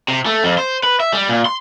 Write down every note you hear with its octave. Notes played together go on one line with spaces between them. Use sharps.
C3
A3
F2
C5
B4
E5
G3
A#2
C6